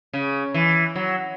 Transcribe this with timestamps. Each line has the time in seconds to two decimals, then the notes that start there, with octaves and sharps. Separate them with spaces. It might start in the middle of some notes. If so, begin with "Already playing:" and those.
0.13 C#3
0.54 E3
0.96 F#3